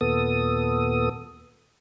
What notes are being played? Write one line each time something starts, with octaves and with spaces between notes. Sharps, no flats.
D#2 A#2 B3 A4 D#6